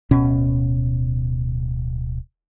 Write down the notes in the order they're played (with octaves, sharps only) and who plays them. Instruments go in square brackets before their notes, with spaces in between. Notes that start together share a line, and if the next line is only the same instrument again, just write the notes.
[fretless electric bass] D1 B2 C#4